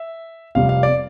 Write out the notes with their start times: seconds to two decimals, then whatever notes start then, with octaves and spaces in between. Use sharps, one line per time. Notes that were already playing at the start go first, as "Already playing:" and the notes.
Already playing: E5
0.55 F1 F2 C3 G3 F5
0.69 F5
0.83 D5